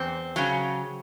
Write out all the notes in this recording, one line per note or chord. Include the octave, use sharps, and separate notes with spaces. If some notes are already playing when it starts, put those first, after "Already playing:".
Already playing: E2 C4
C#3 F#3